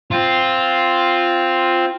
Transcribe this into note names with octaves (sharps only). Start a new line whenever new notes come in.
C4 F4